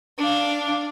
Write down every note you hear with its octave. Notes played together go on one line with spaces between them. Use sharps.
D4 F5